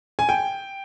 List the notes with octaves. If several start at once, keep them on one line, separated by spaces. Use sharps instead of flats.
G#5
G5